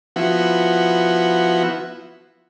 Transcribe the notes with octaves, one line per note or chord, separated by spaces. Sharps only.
F3 B3 E4 F#4